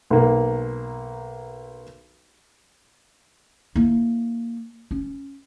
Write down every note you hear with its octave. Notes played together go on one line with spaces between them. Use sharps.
B1 A#3
A#3 E4
C#4